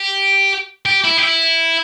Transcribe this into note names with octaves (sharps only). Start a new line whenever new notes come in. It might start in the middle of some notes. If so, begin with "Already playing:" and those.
Already playing: G4
G4
E4
G4
E4